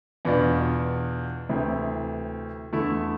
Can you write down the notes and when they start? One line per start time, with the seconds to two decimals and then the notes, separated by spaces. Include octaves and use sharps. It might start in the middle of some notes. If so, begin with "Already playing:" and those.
0.25 E2 B2 B3 D4 F4
1.49 D2 C3 E3
2.73 E2 D3 A3 E4